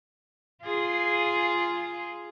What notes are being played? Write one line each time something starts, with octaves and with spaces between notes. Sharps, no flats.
F4 G#4